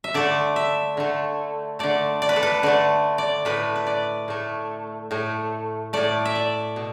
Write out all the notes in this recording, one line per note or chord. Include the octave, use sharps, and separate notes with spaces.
E5
D3 A3 D5
E5
D3 A3
D3 A3 D5
D5
B4
A4
B4
D3 A3 D5
D5
A2 A3 B4
B4
D5
A2 A3
A2 A3
A2 A3 D5
E5
D5
B2